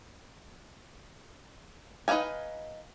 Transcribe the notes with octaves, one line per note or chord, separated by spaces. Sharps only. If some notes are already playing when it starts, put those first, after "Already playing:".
D#4 B4 D#5 F5 G#5